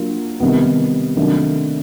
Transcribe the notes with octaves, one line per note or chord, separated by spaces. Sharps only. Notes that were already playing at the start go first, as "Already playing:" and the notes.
Already playing: F#3 A#3 D4 F4
C3 D#3 G3 B3
C3 D#3 F#3 A3 D4